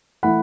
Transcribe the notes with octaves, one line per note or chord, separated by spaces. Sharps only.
E3 A3 E4 F#5 B5